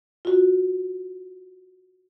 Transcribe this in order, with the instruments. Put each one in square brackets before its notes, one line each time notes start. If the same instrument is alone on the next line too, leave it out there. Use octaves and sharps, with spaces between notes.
[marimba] F4 F#4